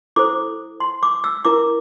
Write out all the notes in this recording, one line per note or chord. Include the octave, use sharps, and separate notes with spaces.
E4 A4 C5 D6
C6
D6
E6
E4 A#4 D6